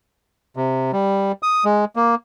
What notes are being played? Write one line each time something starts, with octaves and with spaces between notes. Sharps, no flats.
C3
G3
D#6
G#3
A#3